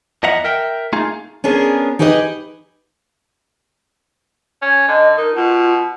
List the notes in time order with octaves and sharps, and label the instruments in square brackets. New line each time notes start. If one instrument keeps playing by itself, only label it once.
[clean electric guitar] E2 F3 D#5 E5 F#5 A#5
A#4 E5 G5
A3 A#3 D#4 F4 G#4
[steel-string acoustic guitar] B3 C#4 D4 G#4 A#4
D#4 G4 G#4 B4 C5 D#5
[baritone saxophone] C#4
[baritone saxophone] D3 [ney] D#5
[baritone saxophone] D#4 [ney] A#4
[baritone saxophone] B2 [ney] F4